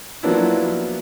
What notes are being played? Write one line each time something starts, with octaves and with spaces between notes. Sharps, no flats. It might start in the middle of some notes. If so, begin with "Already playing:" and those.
F3 F#3 A#3 B3 D4 E4